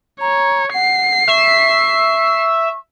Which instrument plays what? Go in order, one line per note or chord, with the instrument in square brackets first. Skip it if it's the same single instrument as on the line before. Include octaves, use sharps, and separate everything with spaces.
[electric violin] C#5 [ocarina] A#5
[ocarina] F#5 [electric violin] C7
[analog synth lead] E5 [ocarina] C#6